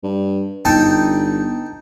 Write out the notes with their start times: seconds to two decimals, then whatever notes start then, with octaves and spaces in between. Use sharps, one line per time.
0.03 G2
0.65 G1 D#4 A4 G5